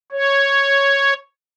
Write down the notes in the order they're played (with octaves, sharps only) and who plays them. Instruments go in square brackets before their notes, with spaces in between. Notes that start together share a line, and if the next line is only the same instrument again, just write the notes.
[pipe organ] C#5